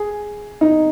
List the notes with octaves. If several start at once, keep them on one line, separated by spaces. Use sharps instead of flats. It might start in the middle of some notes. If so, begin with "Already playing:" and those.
Already playing: G#4
D#4